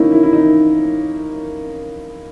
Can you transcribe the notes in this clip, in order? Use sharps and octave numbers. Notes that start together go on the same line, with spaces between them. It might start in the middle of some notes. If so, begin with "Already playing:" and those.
Already playing: A#3 C#4 D#4 E4
E4
E4
D#4